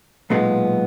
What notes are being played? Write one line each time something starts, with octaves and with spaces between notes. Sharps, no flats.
B1 A#2 G#3 B3